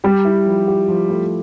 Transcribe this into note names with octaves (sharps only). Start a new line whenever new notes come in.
G3 G4
E4
F3
G4
F3
A3